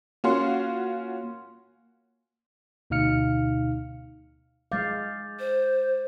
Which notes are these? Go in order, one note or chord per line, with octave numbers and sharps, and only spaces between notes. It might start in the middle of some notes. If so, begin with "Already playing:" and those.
A#3 C#4 F4 F#4 C6
D2 B2 D#4 F5 F6 C#7
G#3 F5 D6 G6 A6
C5